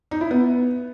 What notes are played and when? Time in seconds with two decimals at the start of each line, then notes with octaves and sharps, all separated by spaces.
0.11 D#4
0.21 E4
0.31 B3